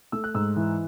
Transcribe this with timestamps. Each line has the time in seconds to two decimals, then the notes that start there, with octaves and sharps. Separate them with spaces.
0.12 A3 E6
0.24 F#6
0.35 G#2 E6
0.56 E3